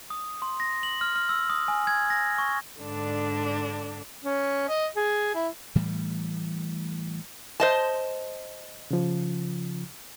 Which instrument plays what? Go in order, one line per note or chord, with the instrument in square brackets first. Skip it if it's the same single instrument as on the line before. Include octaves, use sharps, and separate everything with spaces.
[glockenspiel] D#6
C6
A#6
F#7
F6
F6
E6
D#6
G#5
G#6
A#6
C#6
[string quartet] G#2 D3 D4
[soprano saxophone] C#4
D#5
G#4
E4
[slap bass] A2 E3 G3 A3
[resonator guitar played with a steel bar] C5 D#5 A5
[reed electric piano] C#3 F3